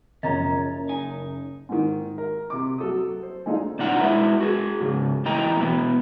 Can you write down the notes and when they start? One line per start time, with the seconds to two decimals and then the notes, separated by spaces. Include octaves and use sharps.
0.23 F#1 F3 C#4 D#5 A#5 B5
0.89 D#4 G#5
1.69 G#2 D#3
2.18 A#4
2.50 C3 D6
2.78 F#3 A4 D#6
3.23 C5
3.46 G#3 A3 D4 D#4 F4
3.79 B2 D4 D#4 F4 F#5 A#5
4.00 G#3 E4 B4 E5
4.40 F#4 G#4
4.81 G#2 C#3
5.25 E2 E3 A3 D#5 G5 A#5
5.60 B2 E3 B3